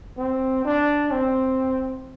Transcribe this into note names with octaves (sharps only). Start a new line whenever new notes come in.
C4
D4
C4